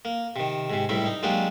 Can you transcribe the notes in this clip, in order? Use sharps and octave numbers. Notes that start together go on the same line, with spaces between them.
A#3
C3 D#3
G#2 C3
C#2 A2 C3 G3 E4
D#4
F#3 G#3 A#3 D4 G4